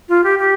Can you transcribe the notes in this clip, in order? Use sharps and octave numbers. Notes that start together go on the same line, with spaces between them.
F4
G4
G4